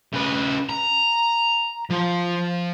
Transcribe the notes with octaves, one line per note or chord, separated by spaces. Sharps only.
C#3 B4
A#5
F3